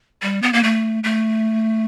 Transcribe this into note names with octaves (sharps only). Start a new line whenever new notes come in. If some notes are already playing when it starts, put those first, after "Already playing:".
G3
B3
A#3
A3
A3